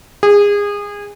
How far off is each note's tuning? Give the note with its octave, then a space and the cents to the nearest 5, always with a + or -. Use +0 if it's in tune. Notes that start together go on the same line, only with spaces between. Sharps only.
G#4 -25